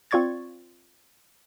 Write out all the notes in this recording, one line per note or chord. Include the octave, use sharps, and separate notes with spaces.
C4 F4 D5 C#6 G#6 A6